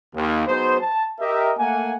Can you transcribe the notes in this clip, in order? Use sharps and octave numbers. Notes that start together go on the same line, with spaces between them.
D#2
F#3 B3 D#4 G#4 C5
A5
G4 A#4 D#5 E5
A3 A#3 F#5 G#5